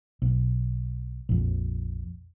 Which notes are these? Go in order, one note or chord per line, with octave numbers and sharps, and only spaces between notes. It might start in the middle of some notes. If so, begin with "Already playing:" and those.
B1
A#1 F2